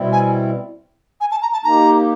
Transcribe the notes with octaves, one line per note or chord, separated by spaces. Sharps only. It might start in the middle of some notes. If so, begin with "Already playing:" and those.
Already playing: B2 G3 C4 E4
G#5
G#5
A5
A#5
A5
A#3 D#4 G4 A#5